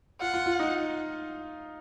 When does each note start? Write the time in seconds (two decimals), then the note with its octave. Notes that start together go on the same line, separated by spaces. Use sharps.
0.21 F4 F#5
0.34 F4
0.46 F4
0.60 D#4